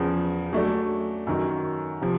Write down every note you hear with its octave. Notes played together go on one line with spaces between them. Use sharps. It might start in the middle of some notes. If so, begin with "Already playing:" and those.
Already playing: E2 C#3 F3
F#3 A3 D4
F#2 D#3 F#3
C3 F3